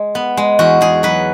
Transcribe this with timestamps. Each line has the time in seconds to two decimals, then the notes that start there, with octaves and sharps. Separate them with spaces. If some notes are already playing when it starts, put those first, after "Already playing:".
Already playing: G#3
0.15 B3
0.37 G#3
0.59 E2 F#4
0.81 E2 G#4
1.03 F#3 B4